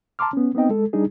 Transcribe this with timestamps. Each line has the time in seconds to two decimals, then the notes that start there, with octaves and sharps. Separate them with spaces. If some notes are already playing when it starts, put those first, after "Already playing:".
0.19 A5 A#5 C6 D6 F6
0.33 B3 C#4
0.55 B3 C4 D#4 D#5 G5
0.69 G#3 A4
0.93 G3 D4 D#4 G#4